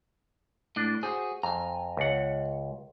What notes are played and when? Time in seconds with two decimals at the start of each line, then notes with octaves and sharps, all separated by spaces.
0.76 A2 D4
1.03 F#4 G#4 C5
1.43 F2 G#5 A#5
1.97 C#2 F#5